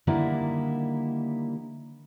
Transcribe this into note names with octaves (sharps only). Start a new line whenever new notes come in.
D3 D#3 G3 A#3 E4